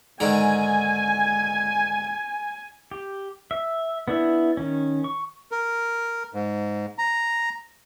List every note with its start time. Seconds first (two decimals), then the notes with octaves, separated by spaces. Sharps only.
0.20 G#2 D3 D#3 G#5
2.91 G4
3.51 E5
4.08 B3 D4 E4 E5
4.57 D#3 C#4
5.04 C#6
5.52 A#4
6.34 G#2
6.98 A#5